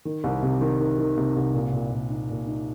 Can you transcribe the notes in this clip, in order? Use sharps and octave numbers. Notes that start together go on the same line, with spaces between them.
D#3
C2
C3
D#3
D#3
D#3
C3
C2
A#2
A#2
A#2
D#4
A#2
D#4